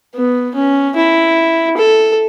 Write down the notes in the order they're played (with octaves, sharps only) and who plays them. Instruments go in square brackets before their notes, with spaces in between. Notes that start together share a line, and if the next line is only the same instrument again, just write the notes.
[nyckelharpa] B3
C#4
E4
A4